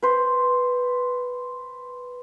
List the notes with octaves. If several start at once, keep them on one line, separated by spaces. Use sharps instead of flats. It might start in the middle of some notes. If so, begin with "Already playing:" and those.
B4 C5